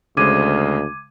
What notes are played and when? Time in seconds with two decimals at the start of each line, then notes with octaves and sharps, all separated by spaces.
0.17 D2 C#3 G#3 C5 D6 G#6 D#7